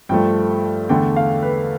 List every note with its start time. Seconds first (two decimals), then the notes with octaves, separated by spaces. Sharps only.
0.09 G2 F3 A3 G5
0.89 E2 D3 A3 G5
1.16 F5
1.43 B4